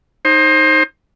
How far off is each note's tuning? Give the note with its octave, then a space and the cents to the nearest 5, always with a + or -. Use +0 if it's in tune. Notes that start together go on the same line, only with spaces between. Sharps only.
D#4 +0 C5 +25